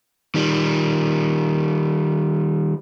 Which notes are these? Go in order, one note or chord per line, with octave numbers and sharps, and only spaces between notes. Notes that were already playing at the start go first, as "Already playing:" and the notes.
D#3 G3